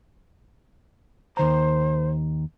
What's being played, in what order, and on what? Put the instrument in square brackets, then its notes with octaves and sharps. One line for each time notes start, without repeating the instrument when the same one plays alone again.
[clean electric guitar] D#2 D#3 A#5 [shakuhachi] C5